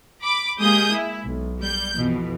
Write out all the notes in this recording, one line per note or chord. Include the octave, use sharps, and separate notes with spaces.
B5 D6
G#3 A#3 G4 G#4 D#6 G6
E4
B1
G3 G6
F2 B2 E3